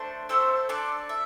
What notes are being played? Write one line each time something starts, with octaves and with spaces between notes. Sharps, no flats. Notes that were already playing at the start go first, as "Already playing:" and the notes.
Already playing: A3 D4 C5
A3 C4 A4 C5
D4 A4 D5 A5
E5